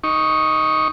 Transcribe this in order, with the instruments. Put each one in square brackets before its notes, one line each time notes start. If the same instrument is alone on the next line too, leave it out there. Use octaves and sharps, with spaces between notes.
[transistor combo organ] D#4 C#6